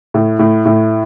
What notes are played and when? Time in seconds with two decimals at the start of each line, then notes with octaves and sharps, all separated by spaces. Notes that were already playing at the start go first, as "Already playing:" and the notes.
0.14 A2
0.39 A2
0.65 A2